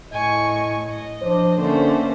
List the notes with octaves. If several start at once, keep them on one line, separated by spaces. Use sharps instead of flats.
A2 D#5 G#5 C#6
D#5
F3 D4 C5
D3 A3 A#3 C#4 C5